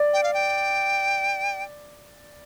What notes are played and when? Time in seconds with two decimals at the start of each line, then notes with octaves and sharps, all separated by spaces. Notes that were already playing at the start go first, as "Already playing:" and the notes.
Already playing: D5
0.13 G5
0.23 F5
0.34 G5